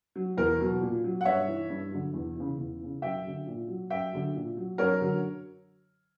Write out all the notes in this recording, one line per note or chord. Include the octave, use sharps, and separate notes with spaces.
F#3
E2 A#4
B2 F#3
A#2
F#3
F#5
G2 C#5 E5
E3
G2
D3 F#3
E2
C#3 E3
E2
C#3 E3
F#2 E5 G5
D3 F#3
A#2
F#3
F#2 E5 G5
D3 F#3
A#2
F#3
F#2 A#4 C#5
D3 F#3